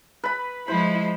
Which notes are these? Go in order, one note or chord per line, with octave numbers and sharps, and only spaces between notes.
B4 B5
F3 G#3 E4 C5 B5